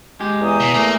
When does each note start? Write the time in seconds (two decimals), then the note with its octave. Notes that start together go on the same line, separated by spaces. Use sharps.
0.20 G#3 G4
0.41 E2 G#5 A#5 D#6
0.60 B2
0.74 A3 A#3 G#4